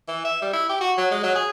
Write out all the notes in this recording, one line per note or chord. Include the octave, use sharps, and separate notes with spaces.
E3
E5
G3
E4
G4
F#4
F#3
G#3
F#3
G#4